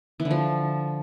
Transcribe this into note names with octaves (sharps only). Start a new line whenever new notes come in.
E3
D3
F3